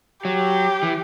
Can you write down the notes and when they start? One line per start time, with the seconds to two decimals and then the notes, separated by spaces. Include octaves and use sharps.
0.25 F#3 G4
0.83 E3